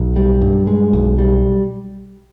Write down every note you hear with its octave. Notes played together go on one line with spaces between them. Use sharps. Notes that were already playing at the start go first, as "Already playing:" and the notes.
Already playing: B1
G3
G2
G#3
B1
G3